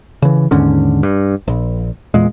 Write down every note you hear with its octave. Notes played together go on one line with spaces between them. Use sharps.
C#3 E3
D#2 G#2 D3 C#4
G2
A#1
E2 A#2 G#3